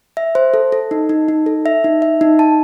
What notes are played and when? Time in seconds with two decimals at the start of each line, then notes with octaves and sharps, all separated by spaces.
0.17 E5
0.35 C5
0.54 A4
0.72 A4
0.91 D#4
1.09 D#4
1.28 D#4
1.46 A4
1.66 E5
1.84 D#4
2.02 E5
2.21 D#4
2.39 A5